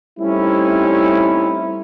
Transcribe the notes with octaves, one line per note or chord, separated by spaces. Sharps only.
G3 A3 C4 C#4 D#4 E4